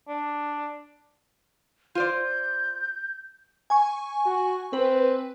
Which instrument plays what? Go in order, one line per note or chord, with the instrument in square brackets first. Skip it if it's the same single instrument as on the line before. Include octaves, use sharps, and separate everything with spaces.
[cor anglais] D4
[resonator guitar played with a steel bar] F4 C5 D5 [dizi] G6
[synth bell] G#5 C#6
[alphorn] F#4
[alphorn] C4 [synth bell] B4